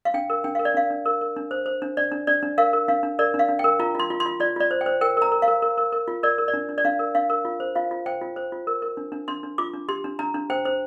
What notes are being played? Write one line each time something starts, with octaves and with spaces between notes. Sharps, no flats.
F5
D4 G5
A#4
D4 G5
A#4 F5
D5
D4 F5
D4
A#4
A#4
D4
C5
C5
D4
D4 D5
D4
D4 D5
D4
A#4 F5
A#4
D4 F5
D4
A#4 D5
D4
F5
D4
A#4 G5
F4 A#5
F4 C6
F4
C6
F4
F4 D5
F4 D5
C5
G5
C5
A#4 G5
A#4 A#5
A#4
F5
A#4
A#4
A#4
A#4
F4
A#4 D5
A#4
D5
D4
D4
D5
D4 F5
A#4
D4 F5
A#4
F4
C5
F4 F5
F4
C5 G5
F4
C5
F4
A#4
A#4
D4
D4
D4 C6
D4
F4 D6
D4
G4 C6
D4
D4 A#5
D4
C5 G5
C5